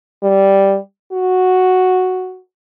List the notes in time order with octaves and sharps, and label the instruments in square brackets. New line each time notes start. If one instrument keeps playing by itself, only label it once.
[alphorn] G3
F#4